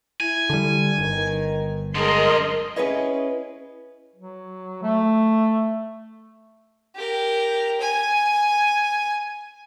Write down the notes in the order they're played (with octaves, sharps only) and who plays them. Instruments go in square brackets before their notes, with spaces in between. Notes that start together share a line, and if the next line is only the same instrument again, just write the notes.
[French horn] E4 [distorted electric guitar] G#5
[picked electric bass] D3 G3
[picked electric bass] G1 [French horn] D#3
[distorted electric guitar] F#3 D4 [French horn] G#3 [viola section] A#4 D#5 C6
[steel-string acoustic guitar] C#4 E4 G#4 B4 C#5 D#5
[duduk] F#3
A3
[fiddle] G4 A#4
G#5